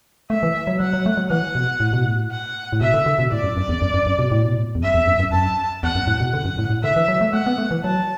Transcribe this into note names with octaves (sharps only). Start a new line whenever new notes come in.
A3 E5
E3
F#3
F#3 F#5
F#3
A3
F#3
E3 F#5
B2
A2
B2
A2
F#5
A2
B2 E5
D3
D3
B2
A2 D5
F#2
F#2
E2
F#2
F#2
F#2
B2
A2
B2
A2
E2
F#2 E5
E2
F#2
F#2
F#2 A5
E2 F#5
F#2
A2
B2
D3 F#5
F#2
A2
A2
D3 E5
E3
F#3
A3
A3 F#5
B3
A3
E3
F#3 A5